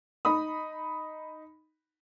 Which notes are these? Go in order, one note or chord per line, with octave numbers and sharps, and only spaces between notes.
D#4 B5 D#6